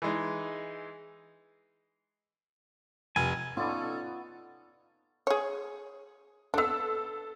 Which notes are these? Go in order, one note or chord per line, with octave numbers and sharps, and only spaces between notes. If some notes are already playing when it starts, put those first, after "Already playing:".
E3 G#3 D#4
F1 G#5
B3 C#4 D#4 F4 A4 D5
G#4 C#5
B3 D4 A4 E6